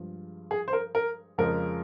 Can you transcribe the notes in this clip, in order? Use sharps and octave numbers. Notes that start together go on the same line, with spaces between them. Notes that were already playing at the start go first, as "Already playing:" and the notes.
Already playing: G2 F3 G#3
G#4
C5
A#4
A#4
F2 C#3 F3 G#3 A#4